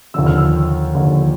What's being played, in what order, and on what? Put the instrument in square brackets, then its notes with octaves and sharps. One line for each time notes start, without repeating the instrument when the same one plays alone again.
[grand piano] D#2 D3 F3 E6
F6
E6
D#2 D3 F3